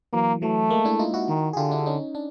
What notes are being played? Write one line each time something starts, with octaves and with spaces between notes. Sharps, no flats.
E3 F#3 A#3
E3 F#3 A3
G#3 A#3
D4 E4
D#4 F4
E4 F#4
D#3
G#4
D3 F4 G4
D4 E4
C#4 D#4
D4